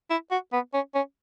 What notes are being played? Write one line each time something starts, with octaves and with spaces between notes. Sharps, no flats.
E4
F#4
B3
C#4
C#4